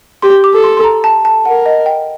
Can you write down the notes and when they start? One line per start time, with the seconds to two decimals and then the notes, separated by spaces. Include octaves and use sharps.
0.22 G4 C6
0.44 D6
0.54 A4
0.64 C6
0.77 C6
0.84 A#5
1.04 A5
1.25 A5
1.45 A#4 F#5
1.66 D#5
1.86 G5